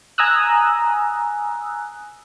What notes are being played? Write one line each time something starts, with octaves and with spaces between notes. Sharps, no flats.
G#5 A#5 D#6 E6 F#6